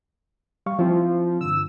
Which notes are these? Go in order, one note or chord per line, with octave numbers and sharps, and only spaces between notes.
G3 F5 C#6
F3 C4 E4
G2 D3 E6